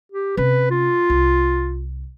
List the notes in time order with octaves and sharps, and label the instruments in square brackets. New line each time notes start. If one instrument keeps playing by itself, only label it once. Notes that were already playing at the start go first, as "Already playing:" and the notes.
[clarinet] G4
[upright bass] C3 C#4 [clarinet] B4
[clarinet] F4
[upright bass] C2